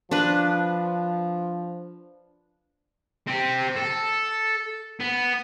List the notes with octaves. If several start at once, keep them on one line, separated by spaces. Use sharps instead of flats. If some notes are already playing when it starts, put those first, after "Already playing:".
F3 D4 B4
C4 G4
A4
B3